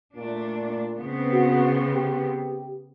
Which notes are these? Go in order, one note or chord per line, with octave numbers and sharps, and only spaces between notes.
A#2 A3 D4
C#3 B3 C4
F#4
G4